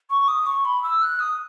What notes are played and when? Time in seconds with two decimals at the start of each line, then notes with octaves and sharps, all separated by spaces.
0.10 C#6
0.28 D#6
0.46 C#6
0.65 B5
0.83 E6
1.02 F#6
1.19 D#6